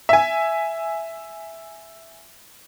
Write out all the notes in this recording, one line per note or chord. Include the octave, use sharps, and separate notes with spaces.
E5 G#5